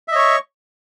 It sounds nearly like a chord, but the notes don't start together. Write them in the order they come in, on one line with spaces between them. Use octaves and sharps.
E5 D#5 C#5 C#6